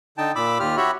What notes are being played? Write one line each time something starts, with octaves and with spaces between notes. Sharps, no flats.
D3 D#4 G5 A5
A#2 B5 D6 E6
D#2 F4 G4 F6
F#4 G4 C#5 E5 B5